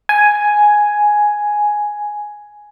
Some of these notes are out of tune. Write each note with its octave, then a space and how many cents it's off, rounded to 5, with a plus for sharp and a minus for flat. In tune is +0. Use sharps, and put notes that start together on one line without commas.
G#5 +5